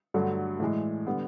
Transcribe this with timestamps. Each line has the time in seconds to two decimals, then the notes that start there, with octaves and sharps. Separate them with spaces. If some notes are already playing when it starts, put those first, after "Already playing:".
0.14 G2 D3 F#3 A3
0.60 A2 E3 G#3
1.07 D3 G3 B3